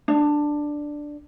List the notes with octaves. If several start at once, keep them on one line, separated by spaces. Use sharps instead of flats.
D4